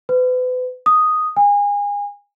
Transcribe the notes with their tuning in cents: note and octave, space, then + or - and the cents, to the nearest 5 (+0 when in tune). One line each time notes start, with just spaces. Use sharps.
B4 +35
D#6 +0
G#5 -30